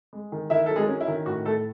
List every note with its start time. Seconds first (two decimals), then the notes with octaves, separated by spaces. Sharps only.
0.13 G#3
0.32 D#3
0.50 D#3 E4 E5
0.66 F#3 A4
0.76 G#3 G#4
0.88 C#4
1.01 E4
1.08 D#3
1.26 A2 F#4
1.45 A2 A3 A4